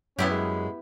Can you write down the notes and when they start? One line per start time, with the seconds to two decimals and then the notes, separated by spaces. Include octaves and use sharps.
0.19 F#2 B3 C#4 E4 G4
0.31 G#3